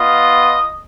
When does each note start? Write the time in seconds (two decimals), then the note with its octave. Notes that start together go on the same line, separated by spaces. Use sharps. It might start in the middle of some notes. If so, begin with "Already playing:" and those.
Already playing: B3 F4 D#5